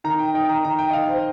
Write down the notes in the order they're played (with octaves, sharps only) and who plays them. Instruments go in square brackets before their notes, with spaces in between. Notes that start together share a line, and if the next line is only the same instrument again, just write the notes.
[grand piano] D#3 A#5
G5
D#4 G5
A#5
D#3 A#5
G5
D#5
D#3 F5
C5